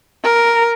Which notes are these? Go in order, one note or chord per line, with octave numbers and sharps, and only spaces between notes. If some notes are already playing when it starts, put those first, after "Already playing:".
A#4